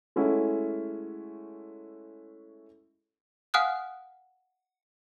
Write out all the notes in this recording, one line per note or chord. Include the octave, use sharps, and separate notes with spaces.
G#3 A3 C#4 E4 F#4
F5 F#5 G#5 D#6 F6 F#6